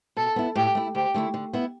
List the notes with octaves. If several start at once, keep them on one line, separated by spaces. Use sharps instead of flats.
B2 A4
B3 E4
A2 G4
A3 E4
D2 G4
D3 A3 E4
D3
B3 E4